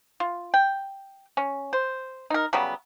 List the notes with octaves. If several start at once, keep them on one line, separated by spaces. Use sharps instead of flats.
F4
G5
C#4
C5
D#4 A#4
C#3 F#3 G3 B3